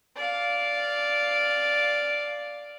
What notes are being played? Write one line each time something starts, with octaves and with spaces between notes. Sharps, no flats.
D5 F5